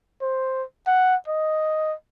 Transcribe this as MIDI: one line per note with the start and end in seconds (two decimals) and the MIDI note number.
0.21 0.63 72
0.87 1.15 78
1.28 1.94 75